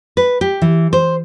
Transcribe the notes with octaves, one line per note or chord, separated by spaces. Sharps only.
B4
G4
E3
C5